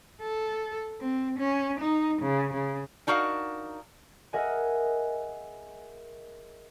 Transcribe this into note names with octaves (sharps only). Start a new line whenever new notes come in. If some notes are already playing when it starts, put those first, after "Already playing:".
A4
C4
C#4
D#4
C#3
C#3
D4 D#4 F#4 A#4 F5 F#5
G#4 A#4 D#5 E5 F#5 G#5